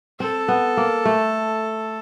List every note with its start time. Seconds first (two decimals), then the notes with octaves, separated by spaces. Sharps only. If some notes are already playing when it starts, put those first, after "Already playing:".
0.20 C4 A4
0.48 B3
0.77 A#3
1.05 A3